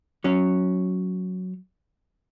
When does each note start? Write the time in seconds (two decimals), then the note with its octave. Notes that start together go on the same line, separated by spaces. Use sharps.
0.24 F#3 C#4